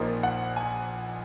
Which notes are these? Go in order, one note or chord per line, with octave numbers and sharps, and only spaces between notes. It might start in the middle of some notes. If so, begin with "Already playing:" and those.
Already playing: A#1 A#2 F3 A#3 D#4
F#5
G#5